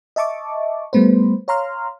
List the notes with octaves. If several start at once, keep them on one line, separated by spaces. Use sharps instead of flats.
D#5 E5 A5 C#6 D6
G3 A3 B3 B4 C5
C#5 F5 A#5 C6 F6